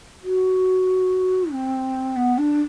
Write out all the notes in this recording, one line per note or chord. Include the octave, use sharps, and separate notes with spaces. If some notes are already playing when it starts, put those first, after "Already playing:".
F#4
C4
B3
D4